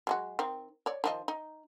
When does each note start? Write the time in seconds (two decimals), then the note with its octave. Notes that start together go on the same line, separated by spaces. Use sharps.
0.07 F#3 G#3 F#4
0.39 D#3 C4
0.86 C#5 D5
1.04 D#3 F3 D#5
1.28 D#4